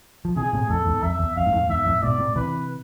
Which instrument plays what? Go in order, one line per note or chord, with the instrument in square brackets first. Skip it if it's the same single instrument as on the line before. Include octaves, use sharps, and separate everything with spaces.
[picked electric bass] F3
[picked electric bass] C3 E3 [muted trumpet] G#4
[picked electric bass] A2 C3
[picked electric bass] F2 A2 [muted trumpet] A4
[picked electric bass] E2 G#2
[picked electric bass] F2 [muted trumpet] E5
[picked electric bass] E2
[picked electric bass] F2 [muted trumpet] F5
[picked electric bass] G#2
F2 A2
[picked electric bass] E2 G#2 [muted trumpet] E5
[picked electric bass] F2 A2
[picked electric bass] G#2 B2 [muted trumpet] D5
[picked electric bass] A2 C3
[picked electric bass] C3 E3 [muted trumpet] B4